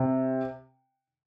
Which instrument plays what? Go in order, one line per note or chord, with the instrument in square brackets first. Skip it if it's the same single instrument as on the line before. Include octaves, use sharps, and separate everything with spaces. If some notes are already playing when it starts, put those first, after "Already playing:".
Already playing: [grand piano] C3